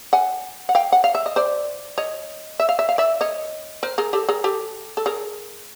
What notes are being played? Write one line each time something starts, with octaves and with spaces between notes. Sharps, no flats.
F#5 G#5
F#5
F5 G5
F#5
F5
E5
D#5
C5 D5
C#5 D#5
E5
F5
E5
F5
D5 E5
C#5 D#5
A#4 C5
G#4 A#4
G4 A4
G#4 A#4
G4 A4
A4
G#4 A#4